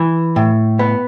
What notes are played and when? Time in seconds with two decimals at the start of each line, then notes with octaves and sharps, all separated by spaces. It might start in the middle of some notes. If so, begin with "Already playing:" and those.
Already playing: E3
0.36 A2
0.79 B3